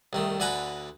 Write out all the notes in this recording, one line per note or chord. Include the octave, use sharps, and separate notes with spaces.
C2 D#3 A3
D2 D3 B4 G#5 A#5 B5